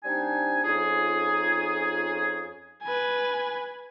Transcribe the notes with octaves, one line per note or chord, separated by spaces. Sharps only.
G3 C4 D4 D#4 G#5
F2 C#4 D#4 F4 G#4
B4 G#5